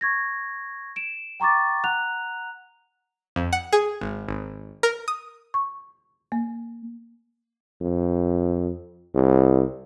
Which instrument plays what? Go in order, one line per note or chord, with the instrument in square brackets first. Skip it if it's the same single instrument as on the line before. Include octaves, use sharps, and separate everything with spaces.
[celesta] C#6 G#6 A#6
D7 E7
G5 A#5 C#6 D6 A6
F#5 A#5 F#6 F7
[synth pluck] F2
F#5
G#4
G#1
G#1
A#4
D#6
[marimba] C#6
A#3
[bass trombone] F2
C2